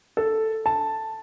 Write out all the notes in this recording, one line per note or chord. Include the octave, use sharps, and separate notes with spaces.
A4
A5